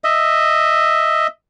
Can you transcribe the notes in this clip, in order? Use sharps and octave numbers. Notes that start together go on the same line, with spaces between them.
D#5 E5